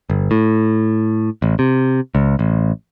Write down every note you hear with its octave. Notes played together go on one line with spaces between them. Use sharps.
G1
A2
A1
C3
C#2
A1